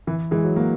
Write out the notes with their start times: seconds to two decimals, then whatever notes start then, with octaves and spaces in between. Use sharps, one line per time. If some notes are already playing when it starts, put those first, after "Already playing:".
0.07 E3
0.31 E3 G#3
0.44 F#3
0.56 F#3 A#3